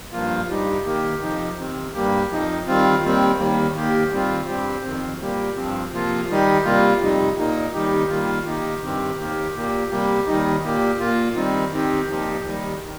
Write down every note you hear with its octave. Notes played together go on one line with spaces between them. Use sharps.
G2 F3 A#3 F4
G2 G3 D#4 G4
D#3 A#3 G4
F2 C3 F3 D#4 G4
C3 D#3 C4
G2 G3 A#3 G4
F2 F3 D#4
D#3 G3 C4 F4
D#2 D#3 G3 C4
D#2 D#3 G3 A#3
D#2 D#3 A#3 G4
D#3 G3 C4 F4
G2 G3 C4 G4
F2 D#3 C4
A#2 G3 A#3 G4
G2 F3 C4
C3 F3 A#3 F4
D#3 G3 D#4 G4
C3 G3 A#3 F4
F2 C3 G3 D#4
A#2 A#3 D#4
D#2 D#3 G3 D#4 G4
D#3 G3 A#3 F4
D#3 A#3 D#4 G4
G2 D#3 C4 G4
D#2 D#3 A#3 G4
A#2 A#3 G4
C3 G3 A#3 G4
D#2 D#3 G3 D#4
A#2 A#3 G4
A#2 A#3 F4
D#3 G3 C4 D#4
D#3 C4 D#4 G4
A#2 F3 D#4 G4
D#2 D#3 G3 D#4
D#3